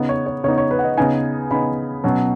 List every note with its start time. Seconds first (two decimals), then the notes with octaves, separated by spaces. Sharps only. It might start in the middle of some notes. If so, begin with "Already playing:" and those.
Already playing: C#3 B3 D#4
0.09 C#5
0.26 C#5
0.44 C#3 B3 D#4 C#5
0.58 C#5
0.71 B4
0.79 F#5
0.84 D#5
0.97 C#3 B3 D#4 G#5
1.51 C#3 B3 D#4 B5
2.04 B2 F#3 C#4